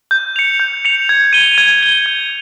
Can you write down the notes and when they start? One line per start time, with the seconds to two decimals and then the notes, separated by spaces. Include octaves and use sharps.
0.11 G6
0.36 C#7 F7
0.60 G6
0.85 C#7 F7
1.09 G#6
1.33 D#7 G7
1.58 G#6
1.82 D#7 G7
2.06 G#6